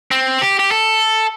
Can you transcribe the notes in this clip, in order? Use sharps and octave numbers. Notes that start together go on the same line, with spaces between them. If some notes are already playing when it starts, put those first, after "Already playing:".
C4
G4
G4
A4